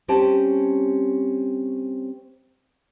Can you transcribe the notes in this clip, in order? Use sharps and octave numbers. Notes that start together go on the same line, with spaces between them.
G3 C4 C#4 G4 G#5 A5